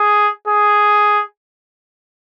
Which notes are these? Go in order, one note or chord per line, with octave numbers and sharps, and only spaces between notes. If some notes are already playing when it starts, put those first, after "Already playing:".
Already playing: G#4
G#4